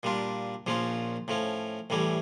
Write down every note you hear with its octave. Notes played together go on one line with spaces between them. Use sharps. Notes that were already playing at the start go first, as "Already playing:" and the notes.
A#2 G3 D4 F4
A#1 A#2 F3 C#4 F4
A2 F3 C#4
A1 A2 E3 G3 C#4